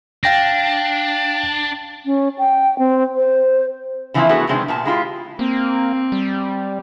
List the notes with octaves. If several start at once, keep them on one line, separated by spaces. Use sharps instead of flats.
D4 F5 G5 A#6
C#4
G5
C4
C5
D3 E3 F3 A3 C4 E4
A3 B3 E4 F#4 G#4
C3 D#3 F3 G#3 C4 D4
A#2 B3 A5
G#3 E4 F4 G4
A#3 C4
G3